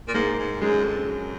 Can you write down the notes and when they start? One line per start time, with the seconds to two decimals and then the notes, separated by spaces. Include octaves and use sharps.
0.08 A#2
0.14 G#2 A#3
0.38 G#2
0.61 F#2 G#3
0.84 F2
1.08 F#2